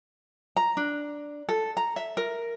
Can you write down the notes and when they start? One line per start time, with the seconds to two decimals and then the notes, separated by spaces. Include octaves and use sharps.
0.57 A#5
0.77 D4
1.49 A4
1.77 A#5
1.96 E5
2.17 A#4